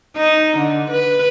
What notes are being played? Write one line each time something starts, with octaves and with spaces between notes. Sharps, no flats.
D#4
D3
B4